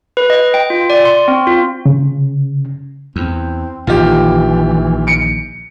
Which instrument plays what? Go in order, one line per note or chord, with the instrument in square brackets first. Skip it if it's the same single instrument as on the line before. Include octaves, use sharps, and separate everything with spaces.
[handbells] B4
D#5
G5
F4
D5
C6
C4
F4
[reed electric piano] C#3
[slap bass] E2 [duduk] C4
[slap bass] A#1 D#3 [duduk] E3 [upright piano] F4 G4
[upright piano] C#7 D7